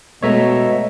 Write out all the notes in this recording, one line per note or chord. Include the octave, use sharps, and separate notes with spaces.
B2 G#3 A3 B3 C#5 D#5 E5 A#5